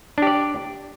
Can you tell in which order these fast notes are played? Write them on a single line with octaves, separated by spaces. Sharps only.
D4 G4 D5